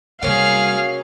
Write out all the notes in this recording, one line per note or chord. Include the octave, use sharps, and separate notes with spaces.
C3 F#3 G3 A#3 C#4 G#4 F5 F6